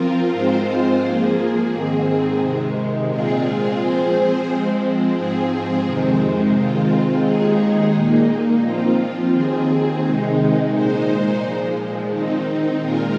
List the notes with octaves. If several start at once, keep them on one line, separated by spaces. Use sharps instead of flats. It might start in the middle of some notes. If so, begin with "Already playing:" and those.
Already playing: F3 C4 F4 A#4
G#2 G#3 C4 F4 C5
F3 A#3 G#4
G#2 D#3 C4 G#4
C3 D#3 G#3
A#2 G#3 C4 F4 G#4
F3 C4 G#4 C5
F3 G#3 C4
G#2 F3 C4 G#4
F2 C3 D#3 G#3 C4
D#3 G#3 C4 F4
D#2 D#3 G#3 D#4 G#4
A#2 A#3 D#4
F3 C4 F4
D#2 D#3 C4 G#4
C3 D#3 G#3 D#4
A#2 G#3 D#4 C5
A#2 F3 G#3
D#3 C4 D#4
A#2 G#3 F4 A#4